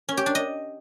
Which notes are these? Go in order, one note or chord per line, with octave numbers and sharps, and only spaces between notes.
C#4
G4
D4
D#5